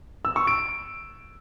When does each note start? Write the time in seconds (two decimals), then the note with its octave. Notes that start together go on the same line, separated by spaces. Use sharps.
0.25 E6
0.36 C#6
0.47 D7